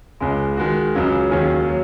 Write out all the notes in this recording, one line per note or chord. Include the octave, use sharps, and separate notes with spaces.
C#2 C#3 G#3
D#3 G#3 F#4
C#2 C#3 F#3
D#2 D#3 F#3 C#4 G#4
F#3